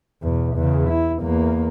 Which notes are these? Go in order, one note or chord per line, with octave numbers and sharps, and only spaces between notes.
E2 B2
E2 C#3
E4
E2 A#3